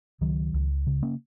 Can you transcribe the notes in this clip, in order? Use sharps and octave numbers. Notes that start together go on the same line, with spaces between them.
C#2 D#3 F#3
C#2
C#3
A#3 C#4